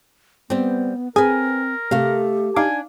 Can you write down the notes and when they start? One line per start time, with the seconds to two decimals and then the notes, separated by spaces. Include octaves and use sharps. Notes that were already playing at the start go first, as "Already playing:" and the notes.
0.50 G3 B3 C4
1.16 C4 G#4 A#4 B4 G#5
1.91 C3 A3 G4 F5
2.56 D4 D#4 F5 G#5 D6